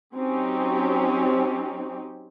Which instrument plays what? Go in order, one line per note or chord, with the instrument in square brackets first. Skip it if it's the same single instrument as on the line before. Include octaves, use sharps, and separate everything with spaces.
[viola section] F#3 C4 C#4 D#4 G4